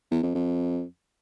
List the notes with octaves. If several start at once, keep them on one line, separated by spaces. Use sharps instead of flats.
E2
F2
F2